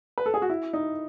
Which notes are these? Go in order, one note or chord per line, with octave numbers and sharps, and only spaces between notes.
B4
A4
G#4
F#4
E4
D#4